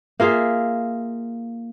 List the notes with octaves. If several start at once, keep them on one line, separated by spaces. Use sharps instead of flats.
A#3 F4 G#4 E5